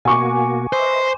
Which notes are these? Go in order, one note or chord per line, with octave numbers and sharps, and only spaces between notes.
B2 A#3 F#4 G#5 C#6 D6
B4 C5 D#5 E5